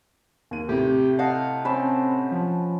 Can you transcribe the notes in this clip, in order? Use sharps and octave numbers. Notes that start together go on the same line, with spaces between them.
D#2 D#7
A2 C3 G4
D#5 F5 F#5 A5
C4 C#4 A5 B5
F3